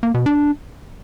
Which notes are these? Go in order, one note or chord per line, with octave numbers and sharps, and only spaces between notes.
A#3
B2
D4